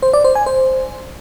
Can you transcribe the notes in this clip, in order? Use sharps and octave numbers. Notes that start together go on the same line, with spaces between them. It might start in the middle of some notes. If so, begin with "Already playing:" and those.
C5
D5
C5
G#5
C5